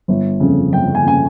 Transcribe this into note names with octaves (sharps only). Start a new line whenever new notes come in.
G1
F2 C#3
G1 G5
G#5
C#3 G#5